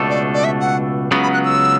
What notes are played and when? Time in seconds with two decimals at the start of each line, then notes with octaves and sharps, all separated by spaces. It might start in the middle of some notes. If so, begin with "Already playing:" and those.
Already playing: C#2 B2 A3 D4 A4
0.10 D5
0.34 D5
0.44 E5
0.61 F#5
1.11 C#2 C#3 F#3 B3
1.23 B5
1.34 F#6
1.45 E6